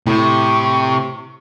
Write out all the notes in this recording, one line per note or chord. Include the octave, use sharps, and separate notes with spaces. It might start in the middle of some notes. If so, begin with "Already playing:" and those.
A2 C3 C#6